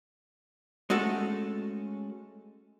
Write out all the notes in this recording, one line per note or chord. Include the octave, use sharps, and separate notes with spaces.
G#3 A3 C#4 F#4 A4